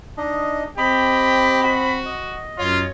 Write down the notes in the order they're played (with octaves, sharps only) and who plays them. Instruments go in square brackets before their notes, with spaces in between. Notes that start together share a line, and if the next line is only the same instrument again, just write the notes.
[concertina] D4 D#4 D#5
[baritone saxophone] C4 [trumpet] G4 [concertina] D#5 [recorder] B5
[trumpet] F#4
[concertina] D#5
[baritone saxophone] F#2 [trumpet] F4 [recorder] C#5